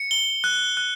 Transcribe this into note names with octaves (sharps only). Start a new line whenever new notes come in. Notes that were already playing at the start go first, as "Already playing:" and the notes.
Already playing: C#7
G7
F#6
F#6